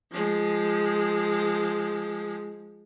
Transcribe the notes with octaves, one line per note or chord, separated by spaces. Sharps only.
F3 G#3